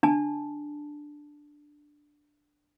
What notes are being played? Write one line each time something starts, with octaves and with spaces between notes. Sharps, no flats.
D4 A5